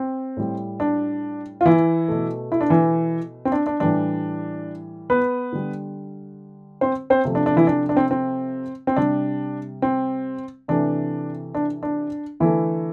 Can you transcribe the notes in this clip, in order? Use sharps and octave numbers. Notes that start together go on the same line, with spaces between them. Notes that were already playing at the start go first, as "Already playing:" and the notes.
Already playing: C4
A2 G3
D4
F4
E3 E4
B2 A3
E4
D4
E3 E4
C4
D4
D4
A2 E3 G3 D4
B3 B4
D3 G3
C4 C5
C4 C5
C3 F3 A3
D4
D4
E3 E4
D4
D4
C4
C4
C4
C3 G3 D4
C4
C3 E3 A3 D4
D4
D4
D3 E3 A3 E4